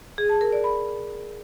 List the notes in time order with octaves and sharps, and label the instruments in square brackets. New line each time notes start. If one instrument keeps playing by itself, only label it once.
[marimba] G#4
A5
A#4
D5
B5